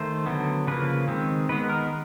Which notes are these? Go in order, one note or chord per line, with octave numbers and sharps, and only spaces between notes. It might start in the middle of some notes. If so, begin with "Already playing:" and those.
Already playing: D#3 A3 C5
D3 F#3 B3
C#3 F3 A#3 B4
D#3 G#3 C4
D#3 G#3 B3 B4
A#4